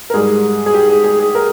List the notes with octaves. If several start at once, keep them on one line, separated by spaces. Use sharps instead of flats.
A#4
G#2 G3 G#4
G#4
G4
G#4
G#4
G#4
A#4